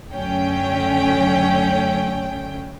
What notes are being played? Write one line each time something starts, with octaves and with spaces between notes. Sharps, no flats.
F#2 D3 F#3 A3 C#4 G5